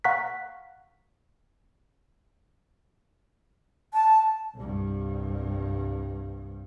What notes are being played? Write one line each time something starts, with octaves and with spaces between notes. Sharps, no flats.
F5 F#5 A#5 C#6 F#6 B6
A5
C2 G2